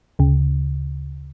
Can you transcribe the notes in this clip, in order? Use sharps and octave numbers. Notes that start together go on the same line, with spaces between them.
D2 C#3